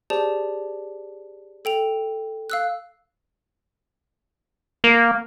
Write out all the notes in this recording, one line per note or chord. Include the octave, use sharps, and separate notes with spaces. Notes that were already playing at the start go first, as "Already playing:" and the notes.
G4 G#4 C5 D5 A5
A4 G5 F7
F5 E6 F#6
A#3